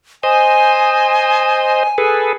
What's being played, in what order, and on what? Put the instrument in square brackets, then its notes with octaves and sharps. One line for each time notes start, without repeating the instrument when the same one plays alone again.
[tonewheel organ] C5 D#5 [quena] G#5
[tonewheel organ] G#4 A4 B4